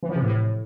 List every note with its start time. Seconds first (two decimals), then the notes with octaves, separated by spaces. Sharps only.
0.03 E3
0.09 F3
0.15 C3
0.22 A2